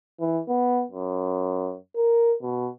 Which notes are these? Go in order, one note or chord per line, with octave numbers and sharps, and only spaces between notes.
E3
B3
F#2
A#4
B2